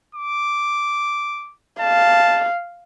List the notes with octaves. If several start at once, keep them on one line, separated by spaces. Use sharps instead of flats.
D6
F5 A5